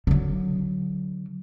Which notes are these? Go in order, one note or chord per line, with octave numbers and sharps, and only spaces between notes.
D3 F#3